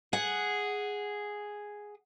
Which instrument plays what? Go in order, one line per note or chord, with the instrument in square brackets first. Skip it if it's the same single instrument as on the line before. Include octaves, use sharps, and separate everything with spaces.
[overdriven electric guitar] G#4 [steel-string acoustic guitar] F#5